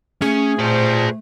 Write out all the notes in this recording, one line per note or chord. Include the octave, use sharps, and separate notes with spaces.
A3 C#4 G#4
A#2 B4 C5 A5